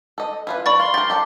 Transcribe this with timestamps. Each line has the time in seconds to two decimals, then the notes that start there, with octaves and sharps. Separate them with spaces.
0.18 A4 D#5
0.47 E4 F4 B4
0.66 F3 A#4 D5 B5 C#6 A6
0.80 F5 C6
0.94 G4 A#4 A6
1.10 G4 A4 D5